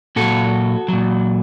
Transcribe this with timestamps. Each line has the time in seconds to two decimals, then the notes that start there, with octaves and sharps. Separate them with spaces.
0.16 A#2 F#3 F#4 A4
0.88 A#2 F#3